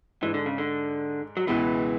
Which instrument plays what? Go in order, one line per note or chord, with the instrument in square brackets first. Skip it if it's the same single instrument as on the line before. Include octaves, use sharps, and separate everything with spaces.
[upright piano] G#2 G#3 D4 [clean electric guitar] E3
[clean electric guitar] D3
C#3
D3
F#3
[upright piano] C#2 B2 G#3 B3 E4 [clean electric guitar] E3